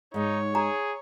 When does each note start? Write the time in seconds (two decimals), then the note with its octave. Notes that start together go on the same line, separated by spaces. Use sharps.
0.14 G#2 G#3 D#4 C#5
0.55 G#4 A#5